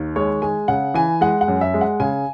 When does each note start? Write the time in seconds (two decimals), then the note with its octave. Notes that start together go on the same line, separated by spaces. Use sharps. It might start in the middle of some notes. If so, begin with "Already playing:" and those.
Already playing: D#2 D#3
0.16 G#3 C#5
0.42 G#3 G#5
0.68 C#3 F#5
0.94 E3 G#5
1.21 G#3 F#5
1.41 F#5
1.48 F#2
1.61 E5
1.74 G#3
1.81 F#5
2.00 C#3 G#5